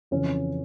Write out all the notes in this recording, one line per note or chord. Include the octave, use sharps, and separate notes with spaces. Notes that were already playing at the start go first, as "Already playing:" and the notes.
F2 C#3 E3 C#4